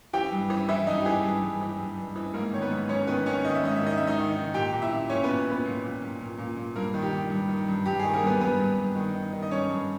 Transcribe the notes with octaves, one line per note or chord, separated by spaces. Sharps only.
E3 G4 G5
G2
E3
E3 E4 E5
G2 D#4 D#5
G4
E3 G#4
G2 G#4
G2
E3
G2
G2
E3
G#2 A#3 A#4
D#3 C#5
B3 B4
G#2
G#2 C#4 C#5
D#3 B3 B4
D#3 C#4 C#5
D#3 D#5
E5
G#2 D#5
E5
D#3
D#5
G#2 E5
D#4 D#5
D#3
D#3
A#2 G4 G5
A#2
E4 E5
A#2
A#2 C#4 C#5
A#2 B3 B4
A#2 B3 B4
A#2
A#2
A#2
A#2
A#2
A#2
G2 A#3 A#4
D#3
G4
D#3
G2
D#3
G2
G2 G4
D#3 G#4
A#3 A#4
G2 B3 B4
G2 B3 B4
G2
G2
D#3
D#3
D#3
D#5
G2 C#4 C#5
G2